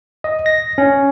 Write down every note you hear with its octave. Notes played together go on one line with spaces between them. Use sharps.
D#5
A#6
C#4